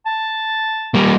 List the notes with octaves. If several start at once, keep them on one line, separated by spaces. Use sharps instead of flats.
A5
G3 A#3